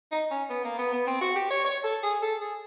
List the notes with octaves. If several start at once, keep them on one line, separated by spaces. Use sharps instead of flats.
D#4
C#4
B3
A#3
B3
B3
C4
F#4
G4
C#5
C#5
A4
G#4
A4
G#4